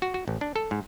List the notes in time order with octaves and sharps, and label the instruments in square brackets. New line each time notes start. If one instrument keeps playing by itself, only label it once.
[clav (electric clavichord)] F#4
F#4
A1
D4
A4
G#2